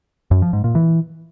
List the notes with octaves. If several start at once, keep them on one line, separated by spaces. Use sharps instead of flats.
F#2
F3
G#2
A#2
E3